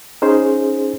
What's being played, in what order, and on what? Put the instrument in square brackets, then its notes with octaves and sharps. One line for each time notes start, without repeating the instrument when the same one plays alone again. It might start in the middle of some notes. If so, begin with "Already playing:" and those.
[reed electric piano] C#4 D#4 G#4 C5